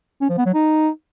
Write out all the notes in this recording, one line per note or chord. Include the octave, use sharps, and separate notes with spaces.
C#4
F3
B3
F#3
D#4